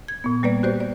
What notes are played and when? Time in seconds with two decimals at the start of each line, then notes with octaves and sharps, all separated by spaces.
0.08 G#6
0.24 A#2 B3
0.43 G3 A#3 B4 D5
0.63 F#4 G4 C5 D5
0.80 D5